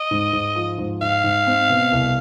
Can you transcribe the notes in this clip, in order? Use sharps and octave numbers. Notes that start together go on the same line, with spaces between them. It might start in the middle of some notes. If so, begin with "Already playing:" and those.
Already playing: D#5
G#2
G#2
F3
G#2
G#2 F5
G#2
C4
B2
C2